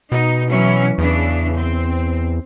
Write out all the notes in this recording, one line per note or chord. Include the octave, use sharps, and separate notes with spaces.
B2 D#4
E3 F#3 C#4
E2 C#3 E3 D4
C4